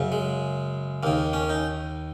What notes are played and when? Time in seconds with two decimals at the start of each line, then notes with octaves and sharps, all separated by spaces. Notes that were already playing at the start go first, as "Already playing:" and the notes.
Already playing: F#2 C#3
0.12 G#3
1.03 D#2 D#3 A#3
1.33 C#4
1.49 D#4